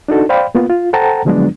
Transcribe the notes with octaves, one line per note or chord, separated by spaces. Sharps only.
D4 D#4 F#4 A4
C5 D5 F5 G5 B5
A#3 B3 F4
F4
A4 C5 F#5 G5 A5 A#5
D3 F3 F#3 G#3 B3 D4